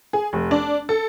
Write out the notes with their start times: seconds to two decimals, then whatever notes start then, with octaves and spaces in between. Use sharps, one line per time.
0.13 G#4
0.33 F1
0.51 D4
0.89 A4